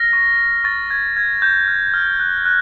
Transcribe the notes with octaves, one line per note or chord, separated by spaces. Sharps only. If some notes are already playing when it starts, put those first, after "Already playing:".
Already playing: F6 A#6
C#6
C#6
C#6 A6
F6 G#6
F6 G#6
C#6 G6
F6
F6
F#6
F#6